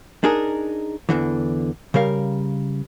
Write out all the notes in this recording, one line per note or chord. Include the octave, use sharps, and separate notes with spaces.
D4 D#4 G#4 A#4
E2 G2 D3 E3
C#3 G3 A#4 F5